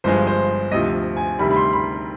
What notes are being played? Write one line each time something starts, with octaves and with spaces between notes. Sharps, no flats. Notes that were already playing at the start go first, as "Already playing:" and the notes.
G1 G2 F3 G#3 C5
C5
D2 C3 F3 D#5
G#5
D2 C3 D#3 G3 B5
B5
C6
B5